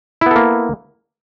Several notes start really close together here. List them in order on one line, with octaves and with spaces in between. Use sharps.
E4 B3 A4 A#3